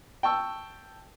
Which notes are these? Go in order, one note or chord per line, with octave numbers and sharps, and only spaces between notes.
G5 A5 C#6 E6